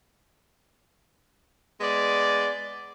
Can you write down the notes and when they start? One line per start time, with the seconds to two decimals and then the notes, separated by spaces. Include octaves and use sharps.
1.81 G#3 B3 D5